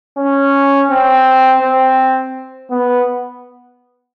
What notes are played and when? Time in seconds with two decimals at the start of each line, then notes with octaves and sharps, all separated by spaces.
0.18 C#4
0.91 C4
1.62 C4
2.71 B3